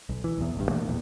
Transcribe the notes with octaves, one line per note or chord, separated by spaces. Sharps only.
B1
E3
B1 E2
A1 G2
B2 E3 A3 A#3
D#1 A#1 E2